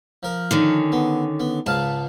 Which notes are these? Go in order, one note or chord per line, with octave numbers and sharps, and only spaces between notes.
F3 A#4
D3 D#3 C#4
B3
B3
C#2 G#2 F5 A5